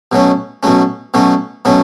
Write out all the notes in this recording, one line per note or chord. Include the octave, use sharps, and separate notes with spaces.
B2 F#3 A3 C#4
B2 F#3 A3 C#4
B2 F#3 A3 C#4
B2 F#3 A3 C#4